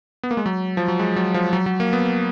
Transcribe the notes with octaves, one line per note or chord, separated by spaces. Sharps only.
B3
A#3
G#3
F#3
F3
F#3
G#3
F#3
F3
F#3
F#3
A#3
B3